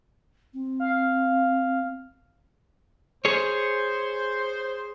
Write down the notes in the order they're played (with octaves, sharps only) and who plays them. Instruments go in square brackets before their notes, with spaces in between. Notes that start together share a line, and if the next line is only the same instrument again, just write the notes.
[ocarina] C4
[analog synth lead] F5
[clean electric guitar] G#4 C#5 [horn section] C5